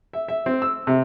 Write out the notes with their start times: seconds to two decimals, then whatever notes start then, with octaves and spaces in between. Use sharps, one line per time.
0.13 E5
0.28 E5
0.46 C4
0.62 E6
0.87 C3